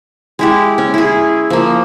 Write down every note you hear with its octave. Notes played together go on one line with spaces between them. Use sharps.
G#3 E4 G4
C#4
E4 G#4
F3 A#3